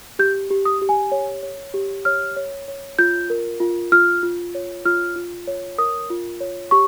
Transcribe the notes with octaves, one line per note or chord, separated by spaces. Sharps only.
G4 G6
G4
D#6
G4
G#5
C#5
C#5
G4
C#5 F6
C#5
C#5
F4 G6
A#4
F4
F4 F6
F4
C#5
F4 F6
F4
C#5
A#4 D#6
F4
C#5
G4 C#6